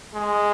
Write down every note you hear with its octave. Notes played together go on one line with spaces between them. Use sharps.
G#3